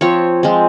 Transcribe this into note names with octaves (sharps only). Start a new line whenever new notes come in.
F3 C4 C#5
F3 G#3 C4